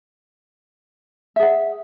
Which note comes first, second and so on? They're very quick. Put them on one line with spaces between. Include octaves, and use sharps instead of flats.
E5 G#4 F#5